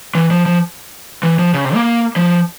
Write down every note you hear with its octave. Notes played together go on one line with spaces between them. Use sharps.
E3
F3
F3
E3
F3
C#3
C3
A#3
F3